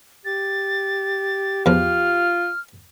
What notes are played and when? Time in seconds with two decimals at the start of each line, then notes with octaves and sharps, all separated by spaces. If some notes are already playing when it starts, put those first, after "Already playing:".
0.25 G4 A6
1.66 E2 F3 F4 F6